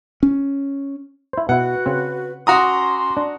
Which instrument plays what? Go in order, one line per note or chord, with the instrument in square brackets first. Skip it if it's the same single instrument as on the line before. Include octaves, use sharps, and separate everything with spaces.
[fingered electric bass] C#4
[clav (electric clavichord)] E4 C5
[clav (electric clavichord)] B2 E4 [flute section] F#4 B4 [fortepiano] F#5
[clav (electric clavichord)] C#3 C4
[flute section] C#4 C6 D6 [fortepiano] F#4 A#5 D#6
[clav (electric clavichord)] D4